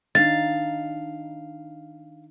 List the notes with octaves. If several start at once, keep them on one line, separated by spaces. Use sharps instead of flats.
D#3 D4 D#4 F5 A6